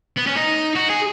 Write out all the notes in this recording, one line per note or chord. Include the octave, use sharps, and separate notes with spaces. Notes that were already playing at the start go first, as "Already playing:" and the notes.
B3
C#4
D#4
F#4
G#4